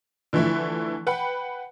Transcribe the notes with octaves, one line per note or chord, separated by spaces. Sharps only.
D3 E3 F3 A3 E4
B4 F#5 G5 B5